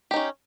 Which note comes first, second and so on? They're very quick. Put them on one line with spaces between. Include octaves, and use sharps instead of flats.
G4 D#4 C#4